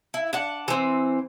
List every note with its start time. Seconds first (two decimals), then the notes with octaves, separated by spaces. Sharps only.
0.14 E4
0.33 D4 F#5
0.68 E3 C4